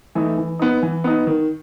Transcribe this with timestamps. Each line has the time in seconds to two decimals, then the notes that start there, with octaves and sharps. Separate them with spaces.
0.15 E3 A3 D#4
0.38 E3
0.59 B3 D#4
0.83 E3
1.04 B3 D#4
1.27 D#3